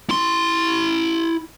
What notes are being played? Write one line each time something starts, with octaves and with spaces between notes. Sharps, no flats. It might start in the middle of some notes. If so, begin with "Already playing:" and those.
E4 C6